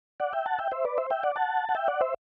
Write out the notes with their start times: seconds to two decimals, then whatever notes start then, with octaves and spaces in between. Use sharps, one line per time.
0.20 D5 F#5
0.33 E5 G5
0.46 F#5 A5
0.59 E5 G5
0.72 C5 E5
0.85 B4 D5
0.98 C5 E5
1.10 E5 G5
1.23 D5 F#5
1.36 F#5 A5
1.69 F#5
1.75 E5 G5
1.88 D5 F#5
2.01 C5 E5